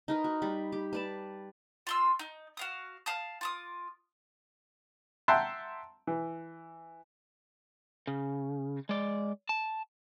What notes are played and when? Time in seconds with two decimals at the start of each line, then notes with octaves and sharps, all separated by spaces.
0.08 D#4 A#4 B4
0.24 F#4
0.42 G3 B5
0.72 G4
0.93 B4 D5 A5
1.87 F4 C6 E6
2.19 D#4
2.57 F#4 F5 D#6
3.06 F5 A5 D#6
3.41 F4 D6 D#6
5.28 E5 F#5 G5 A5 A#5 C6
6.07 E3
8.07 C#3
8.89 G#3 D5
9.49 A5